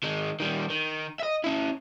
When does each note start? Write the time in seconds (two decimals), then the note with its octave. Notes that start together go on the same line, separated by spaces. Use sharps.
0.04 D#3 G#3
0.40 D#3 G3
0.70 D#3
1.19 D#5 E5
1.44 C#4 E4